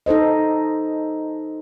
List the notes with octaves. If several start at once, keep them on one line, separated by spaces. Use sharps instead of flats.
D#4 A4 C5 D#5